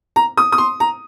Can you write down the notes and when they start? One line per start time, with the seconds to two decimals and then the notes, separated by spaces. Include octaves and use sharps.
0.16 A#5
0.37 D#6
0.52 D#6
0.58 C6
0.80 A#5